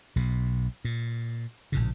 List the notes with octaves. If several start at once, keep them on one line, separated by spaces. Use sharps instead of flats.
B1 B2
A#2
A#1 A2 C#3